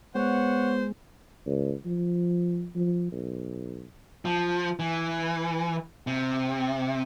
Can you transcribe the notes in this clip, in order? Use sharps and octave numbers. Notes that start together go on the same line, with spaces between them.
G#3 B3 C5 C#5 F#5
C#2
F3
F3
B1
F3
E3
C3